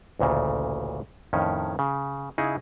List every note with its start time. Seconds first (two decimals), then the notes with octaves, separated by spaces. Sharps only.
0.19 A1 D2 A#2 C#3
1.33 F2 A2 D#3 C#4
1.79 C#3
2.38 C#3 D#4 E4 G#4